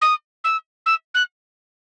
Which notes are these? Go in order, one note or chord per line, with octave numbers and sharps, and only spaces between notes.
D#6
E6
E6
F#6